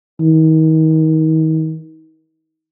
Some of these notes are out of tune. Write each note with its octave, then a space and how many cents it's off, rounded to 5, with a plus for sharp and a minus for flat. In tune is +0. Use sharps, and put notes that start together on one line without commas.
D#3 +35